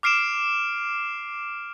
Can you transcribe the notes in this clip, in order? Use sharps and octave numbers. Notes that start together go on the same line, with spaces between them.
D6 F6 C7 D7 E7